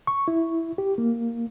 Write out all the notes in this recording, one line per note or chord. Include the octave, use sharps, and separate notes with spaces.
C#6
E4
G4
A#3